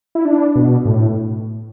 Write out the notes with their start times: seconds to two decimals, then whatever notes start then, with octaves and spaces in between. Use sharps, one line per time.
0.15 E4
0.25 D4
0.56 B2
0.85 A2